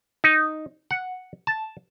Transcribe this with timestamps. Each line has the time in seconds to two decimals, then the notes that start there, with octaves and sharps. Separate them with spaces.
0.24 D#4
0.91 F#5
1.47 A5